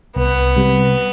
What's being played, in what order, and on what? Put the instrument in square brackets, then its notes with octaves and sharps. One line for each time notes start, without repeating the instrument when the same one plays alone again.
[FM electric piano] C2 [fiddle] B3
[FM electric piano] C3 G3